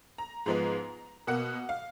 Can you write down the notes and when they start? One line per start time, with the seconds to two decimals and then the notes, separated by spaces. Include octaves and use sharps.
0.18 A#5
0.46 G#2 F3 G#3 B3 A#5
1.27 B2 A#3 F#5
1.69 F5